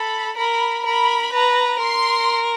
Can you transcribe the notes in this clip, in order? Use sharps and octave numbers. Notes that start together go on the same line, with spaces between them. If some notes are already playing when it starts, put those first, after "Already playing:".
Already playing: A4 B5
A#4 B5
A#4 B5
B4 A#5
A#4 C6